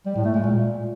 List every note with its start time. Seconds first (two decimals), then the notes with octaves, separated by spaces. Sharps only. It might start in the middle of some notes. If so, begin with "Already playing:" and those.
0.06 G3
0.16 A2
0.25 A3
0.34 G#3
0.44 A#2